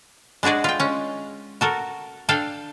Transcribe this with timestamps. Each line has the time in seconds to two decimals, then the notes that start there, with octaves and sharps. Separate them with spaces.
0.43 G#3 D4 F#4 G#4 D5
0.64 F4 G5
0.80 G#3 C#4
1.61 F#4 A4 A#4
2.29 D4 A4 F5 G5